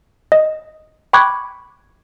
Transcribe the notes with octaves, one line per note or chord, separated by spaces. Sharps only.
D#5
G5 B5 C#6 D6 F#6 G#6